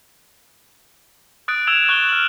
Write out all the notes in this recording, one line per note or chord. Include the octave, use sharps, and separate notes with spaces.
D#6 F#6 A6 D7
E6 G#6 D7 E7 F7
C#6 F#6 E7 G7
F6 F#7